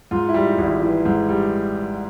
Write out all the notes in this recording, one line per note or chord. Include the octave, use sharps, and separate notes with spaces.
G#2 F4
E4
G3
D#4
G#1
E4
E3 E4
G#2
G3